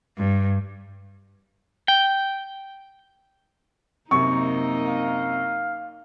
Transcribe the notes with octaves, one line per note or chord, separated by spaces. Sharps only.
G2
G5
F#2 C3 A#3 D#4 C#6
F5